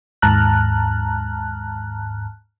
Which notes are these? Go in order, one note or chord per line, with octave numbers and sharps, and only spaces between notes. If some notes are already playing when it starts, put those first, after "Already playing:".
D#2 G#2 A5 A#5 F6 F#6